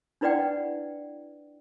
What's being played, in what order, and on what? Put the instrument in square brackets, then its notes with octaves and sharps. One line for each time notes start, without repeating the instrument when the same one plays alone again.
[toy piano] D4 E4 B4 D5 F#5 G5